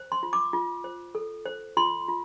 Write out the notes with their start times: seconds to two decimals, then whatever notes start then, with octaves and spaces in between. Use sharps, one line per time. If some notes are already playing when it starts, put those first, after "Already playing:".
Already playing: C5
0.12 C6
0.23 F4
0.33 D6
0.53 F4
0.84 C5
1.15 A4
1.46 C5
1.77 F4 C6
2.08 F4